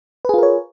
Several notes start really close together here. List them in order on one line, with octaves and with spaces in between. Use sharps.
B4 G#4 F4 A#4 C#5